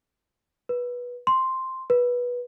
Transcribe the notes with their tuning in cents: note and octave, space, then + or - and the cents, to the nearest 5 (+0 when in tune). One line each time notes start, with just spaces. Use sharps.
B4 -15
C6 +0
B4 -15